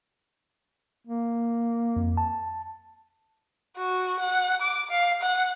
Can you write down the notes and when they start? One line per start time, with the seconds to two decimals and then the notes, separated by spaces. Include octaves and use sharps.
1.07 A#3
1.96 F2
2.17 A5
3.77 F#4
4.20 F#5
4.61 D6
4.90 F5
5.22 F#5